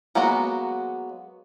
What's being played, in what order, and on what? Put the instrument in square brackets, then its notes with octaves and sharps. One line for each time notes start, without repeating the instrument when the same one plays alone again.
[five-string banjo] F#3 G#3 A#3 B3 F#4